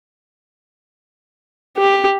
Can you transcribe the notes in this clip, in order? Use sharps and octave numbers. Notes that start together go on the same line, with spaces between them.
G4